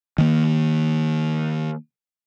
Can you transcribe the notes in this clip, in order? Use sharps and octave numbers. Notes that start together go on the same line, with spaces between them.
D#3 A#3